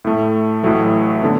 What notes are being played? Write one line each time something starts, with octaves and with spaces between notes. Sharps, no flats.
A2 A3
A1 A2 F#3 A3
D3 B3